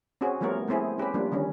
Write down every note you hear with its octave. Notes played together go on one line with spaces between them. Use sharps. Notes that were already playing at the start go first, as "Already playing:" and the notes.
C4 C#4 F#4 G#4
F3 G3 A3 B3 A#4 C#5
G#3 A3 B3 C4 E4 G#4
C#4 G4 G#4 B4
F3 G3 A#3 D4
D3 D#3 G3 C#4